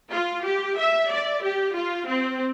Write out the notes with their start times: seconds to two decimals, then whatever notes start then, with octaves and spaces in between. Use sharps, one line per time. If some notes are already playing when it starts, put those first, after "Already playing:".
0.12 F4
0.44 G4
0.77 E5
1.10 D5
1.42 G4
1.75 F4
2.08 C4